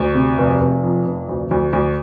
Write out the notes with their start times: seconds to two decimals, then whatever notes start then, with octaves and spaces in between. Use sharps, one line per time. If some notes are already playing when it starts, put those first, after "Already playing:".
Already playing: D2
0.14 C3
0.38 F1
0.60 F1
0.83 F2
1.05 F1
1.29 D2
1.51 D2
1.73 D2